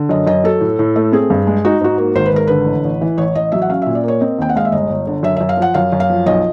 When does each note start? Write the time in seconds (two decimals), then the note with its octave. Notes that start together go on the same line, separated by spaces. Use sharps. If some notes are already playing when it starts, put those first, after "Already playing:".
Already playing: D3
0.09 F#2 D#5
0.27 F#2 D#5
0.44 F#3 A4
0.61 A2
0.79 A2
0.96 A3
1.12 C4 G#4
1.30 G2
1.47 G#3
1.65 D#4 F#4
1.81 G#2 F#4
1.98 A#3
2.15 G#1 C5
2.26 B4
2.33 G#1 A#4
2.47 D3 B4
2.66 A1
2.84 A1
3.01 E3
3.18 A1 C#5
3.35 A1 D#5
3.52 F#3 E5
3.62 F#5
3.69 C#4 F5
3.82 A#2 E5
3.95 D5
4.03 A#3 C#5
4.20 C4 D#5
4.38 D#2 G5
4.49 F#5
4.56 G#3 F5
4.65 E5
4.72 G1 D#5
4.90 G1
5.07 D3
5.23 F#2 E5
5.36 F#2 E5
5.49 F5
5.57 F3 F#5
5.74 F#2 F5
5.92 F#2
6.00 F5
6.10 F3
6.26 B1 D#5